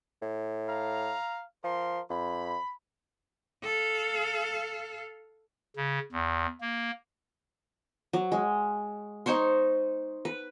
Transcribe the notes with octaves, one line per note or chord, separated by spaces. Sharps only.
A2
F5 A#5
F3 A#4 C6
F2 B5
A4 F5
C#3
E2
A#3
F#3
G#3
D#4 C5 C#5 C6
B4